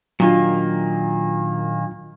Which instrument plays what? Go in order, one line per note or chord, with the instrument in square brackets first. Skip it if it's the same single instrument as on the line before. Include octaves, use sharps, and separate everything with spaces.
[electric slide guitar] A#2 D#3 A#3 [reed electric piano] F#3 D4 F4